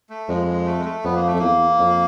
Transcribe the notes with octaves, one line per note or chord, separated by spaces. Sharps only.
A3
F2 G#3
G#3
A3
G#3
A3
F2 B3
A#3
A3
F2
E2 A#3
F2